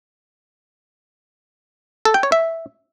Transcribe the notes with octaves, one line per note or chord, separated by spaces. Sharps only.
A4
G5
C#5
E5